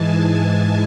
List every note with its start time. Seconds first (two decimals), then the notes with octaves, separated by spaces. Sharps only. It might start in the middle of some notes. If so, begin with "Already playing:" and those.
Already playing: G#2 E3 G#3 G#5 A5
0.30 G#5